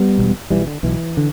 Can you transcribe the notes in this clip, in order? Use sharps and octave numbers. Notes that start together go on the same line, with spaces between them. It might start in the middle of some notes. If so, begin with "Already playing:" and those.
Already playing: G3 B3
E1 E2 B2
B1 B2 E3 G3
D3
B1 B2 E3
D3